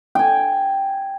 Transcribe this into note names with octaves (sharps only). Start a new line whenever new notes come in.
G5 G#5